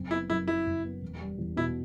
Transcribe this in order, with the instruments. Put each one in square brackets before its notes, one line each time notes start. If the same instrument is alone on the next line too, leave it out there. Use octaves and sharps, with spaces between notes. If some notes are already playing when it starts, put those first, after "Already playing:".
Already playing: [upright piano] F#1 C4
[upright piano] B3 [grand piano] E4
[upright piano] F#2 [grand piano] E4
[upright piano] F#3 [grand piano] E4
[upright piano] F#1
B3
E1
G3
E2
[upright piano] B2 [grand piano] E4